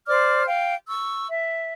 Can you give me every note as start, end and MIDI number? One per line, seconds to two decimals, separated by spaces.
0.07 0.46 72
0.07 0.46 74
0.07 0.46 86
0.07 0.46 89
0.47 0.74 77
0.47 0.74 79
0.89 1.27 85
0.89 1.27 88
1.28 1.72 76